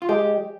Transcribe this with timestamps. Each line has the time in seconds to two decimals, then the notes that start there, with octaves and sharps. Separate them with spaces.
0.02 F4
0.09 G#3 G4